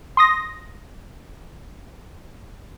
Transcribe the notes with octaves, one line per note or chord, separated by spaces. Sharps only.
C6 D#6 A#6